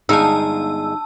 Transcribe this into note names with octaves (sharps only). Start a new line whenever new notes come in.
G1 G#3 D#4 F5 A5 E6